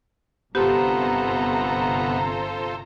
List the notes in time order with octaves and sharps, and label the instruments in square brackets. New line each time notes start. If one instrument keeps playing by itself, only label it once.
[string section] G1 C3 A#5 [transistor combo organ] B3 [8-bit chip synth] F4 A4 C5 [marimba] G4